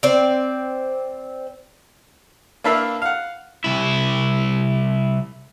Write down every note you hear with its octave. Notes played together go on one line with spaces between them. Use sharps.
C4 D5
A#3 D4 B4 E5 F5
F5 F#5
C2 E4